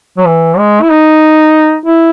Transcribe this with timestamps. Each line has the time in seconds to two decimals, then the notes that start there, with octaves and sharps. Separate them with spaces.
0.18 F#3
0.26 E3
0.58 G#3
0.82 E4
0.90 D#4
1.86 E4